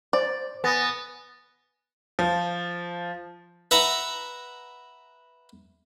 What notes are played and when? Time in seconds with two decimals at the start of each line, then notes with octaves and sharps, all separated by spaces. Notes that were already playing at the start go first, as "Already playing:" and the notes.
0.13 C5 D5
0.64 B3 G#5 A6 A#6
2.19 F3
3.71 B4 E5 F#5 A#5